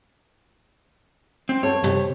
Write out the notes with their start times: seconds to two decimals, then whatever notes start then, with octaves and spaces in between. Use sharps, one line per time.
1.49 C4
1.63 A4 C#5 F#5
1.83 D#2 C3